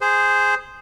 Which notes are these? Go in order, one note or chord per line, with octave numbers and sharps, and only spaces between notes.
G#4 C5